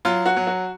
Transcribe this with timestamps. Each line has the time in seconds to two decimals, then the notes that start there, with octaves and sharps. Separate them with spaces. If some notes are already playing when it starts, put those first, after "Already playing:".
0.05 F#3 F4
0.26 F#4
0.36 F#3
0.47 F#4